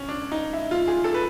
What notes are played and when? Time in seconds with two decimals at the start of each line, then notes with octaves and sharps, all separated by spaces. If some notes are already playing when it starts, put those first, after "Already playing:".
Already playing: C#4
0.09 D4
0.32 D#4
0.53 E4
0.71 F4
0.88 G#4
1.04 A4
1.14 B4